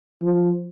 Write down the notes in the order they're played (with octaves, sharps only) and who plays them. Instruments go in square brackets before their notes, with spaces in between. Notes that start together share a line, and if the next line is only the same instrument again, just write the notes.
[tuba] F3